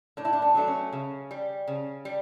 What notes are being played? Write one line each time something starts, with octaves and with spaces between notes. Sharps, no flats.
A2 D4
E4
D4
B3
F#3 A3 D4
C#4
C#3
G3
C#3
G3